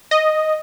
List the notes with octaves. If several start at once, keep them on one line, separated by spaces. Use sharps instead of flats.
D#5